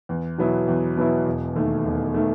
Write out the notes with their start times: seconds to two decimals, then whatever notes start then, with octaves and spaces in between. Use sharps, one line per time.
0.09 E2
0.38 B2 F#3 B3 E4
0.68 E2
0.97 B2 F#3 B3 E4
1.26 E1
1.56 D#2 D#3 A3
1.85 E1
2.14 D#3 A3